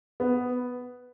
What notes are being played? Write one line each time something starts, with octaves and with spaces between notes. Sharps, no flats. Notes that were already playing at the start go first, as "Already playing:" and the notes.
B3